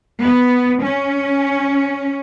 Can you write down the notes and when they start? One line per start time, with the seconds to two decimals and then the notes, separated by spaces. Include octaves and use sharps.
0.22 B3
0.83 C#4